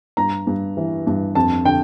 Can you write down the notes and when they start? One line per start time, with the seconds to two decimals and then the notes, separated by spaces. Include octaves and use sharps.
0.17 G2 A#5
0.47 G2
0.77 E3
1.07 G2
1.35 F2 A5
1.65 D3 G5